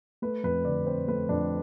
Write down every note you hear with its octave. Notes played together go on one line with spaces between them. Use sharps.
A3 B4
F2 B4
D3 D5
C4 C5
A3 B4
F2 D4